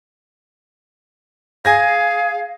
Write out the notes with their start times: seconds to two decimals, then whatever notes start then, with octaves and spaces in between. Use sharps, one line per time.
1.65 G#4 F5 G#5 G#6 A#6